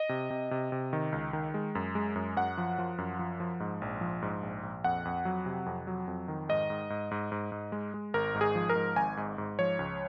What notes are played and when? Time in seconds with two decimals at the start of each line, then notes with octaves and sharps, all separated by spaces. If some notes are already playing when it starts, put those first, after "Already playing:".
Already playing: D#5
0.09 C3
0.30 C3
0.51 C3
0.72 C3
0.93 D#3
1.12 C#2
1.33 D#3
1.54 G#3
1.75 F#2
1.95 G#3
2.15 F#2
2.36 F#2 F#5
2.58 F3
2.79 F3
2.98 F#2
3.19 F3
3.40 F3
3.60 G#2
3.82 A#1
4.01 F3
4.22 G#2
4.43 A#1
4.63 A#1
4.84 F2 F#5
5.05 F2
5.25 F#3
5.46 C3
5.66 F2
5.87 F#3
6.07 F2
6.28 D#3
6.49 G#2 D#5
6.70 G#2
6.90 G#2
7.11 G#2
7.32 G#2
7.52 G#2
7.72 G#3
7.94 G#3
8.14 G#1 A#4
8.34 G#2
8.41 G#4
8.55 F3
8.70 A#4
8.76 G#2
8.96 G#1 G#5
9.17 G#2
9.38 G#2
9.59 F3 C#5
9.79 C#2